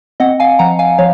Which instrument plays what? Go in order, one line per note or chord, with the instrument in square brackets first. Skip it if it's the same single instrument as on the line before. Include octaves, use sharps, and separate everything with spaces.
[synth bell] C4 D#5 F#5
F5 G#5
F3 F#5 A#5
F5 G#5
F3 C#5 F5